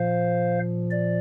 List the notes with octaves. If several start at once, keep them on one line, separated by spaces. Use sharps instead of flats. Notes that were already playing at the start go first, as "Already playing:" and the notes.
Already playing: A#2 F3 C5 F5
D5